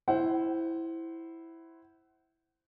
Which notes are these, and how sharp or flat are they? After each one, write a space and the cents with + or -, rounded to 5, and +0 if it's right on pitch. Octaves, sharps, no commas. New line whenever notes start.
E4 +0 C5 +0 F#5 +25